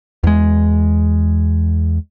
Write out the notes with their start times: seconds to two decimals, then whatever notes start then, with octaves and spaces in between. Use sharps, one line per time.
0.24 E2 G#3